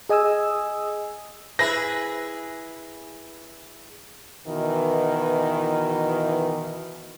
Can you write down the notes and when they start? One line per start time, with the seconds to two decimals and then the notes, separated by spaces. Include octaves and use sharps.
0.09 G#4 D#5 G#5 D#6 E6
1.59 E4 G#4 B4 A#6
4.47 B2 D#3 E3